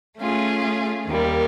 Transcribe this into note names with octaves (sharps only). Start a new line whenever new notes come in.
A3 C#4 F4 G#4
D#2 D#3 G3 A#3